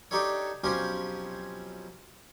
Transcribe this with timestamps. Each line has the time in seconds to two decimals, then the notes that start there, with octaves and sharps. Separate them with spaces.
0.11 D4 D#4 G4 A4 C#5
0.64 B1 F3 C4 C#4 G4 G#5